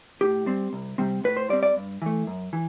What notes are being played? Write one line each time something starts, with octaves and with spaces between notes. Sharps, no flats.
A2 G4
G3 C4
C2
C3 G3 C4
A2 B4
C5
G3 C4 D5
D5
G2
E3 A3
F#2
E3